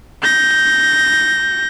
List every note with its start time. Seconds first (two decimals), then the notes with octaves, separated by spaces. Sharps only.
0.23 G6 A#6